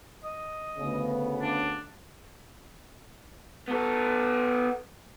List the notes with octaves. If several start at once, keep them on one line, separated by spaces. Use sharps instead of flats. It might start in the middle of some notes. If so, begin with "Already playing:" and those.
D#5
D2 C#3 B3
D4
B3 A4